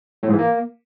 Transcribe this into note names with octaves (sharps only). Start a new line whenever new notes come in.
A2
G#2
E3
A#3